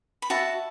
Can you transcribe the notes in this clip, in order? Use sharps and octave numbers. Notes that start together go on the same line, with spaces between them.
B5
F#4 E5 A5